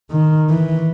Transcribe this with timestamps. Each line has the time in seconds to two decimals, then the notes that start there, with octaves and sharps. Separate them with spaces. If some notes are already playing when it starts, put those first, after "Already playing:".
0.11 D#3
0.50 E3